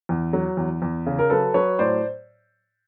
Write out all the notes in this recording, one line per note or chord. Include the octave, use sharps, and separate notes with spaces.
E2
F#3
E2
E2
C#3
A#4
F#3 A4 B4
F#3 B4 C#5
A2 C5 D5